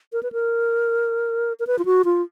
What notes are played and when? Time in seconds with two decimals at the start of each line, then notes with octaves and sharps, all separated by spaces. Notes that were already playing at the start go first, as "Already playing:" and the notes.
0.13 A#4
0.23 B4
0.32 A#4
1.60 A#4
1.67 B4
1.79 F4
1.85 F#4
2.05 F4